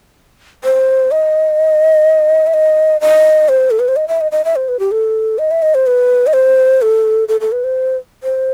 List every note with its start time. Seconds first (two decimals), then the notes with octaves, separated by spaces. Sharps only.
0.64 C5
1.11 D#5
2.47 E5
2.54 D#5
3.01 D#5
3.49 C5
3.71 A4
3.79 B4
3.88 C5
3.96 D#5
4.08 E5
4.21 D#5
4.32 D#5
4.45 E5
4.56 C5
4.68 B4
4.79 G4
4.91 A4
5.38 D#5
5.51 E5
5.62 D#5
5.75 C5
5.87 B4
6.27 D#5
6.34 C5
6.82 A4
7.28 A4
7.41 A4
7.52 B4
7.64 C5
8.23 C5